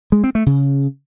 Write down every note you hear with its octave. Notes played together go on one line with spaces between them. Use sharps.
G#3
C4
A3
C#3